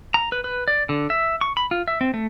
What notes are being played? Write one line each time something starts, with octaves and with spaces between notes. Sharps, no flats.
A#5
B4
B4
D5
D3
E5
C#6
B5
F4
E5
C4
A3